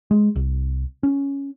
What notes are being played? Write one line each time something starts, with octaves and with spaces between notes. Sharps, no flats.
G#3
C2
C#4